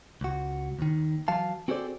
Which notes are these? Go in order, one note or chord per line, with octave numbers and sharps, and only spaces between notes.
C#2 F#4
D#2 D#3
E3 F#3 F5 A5
C4 F#4 G#4 A4 C5 D5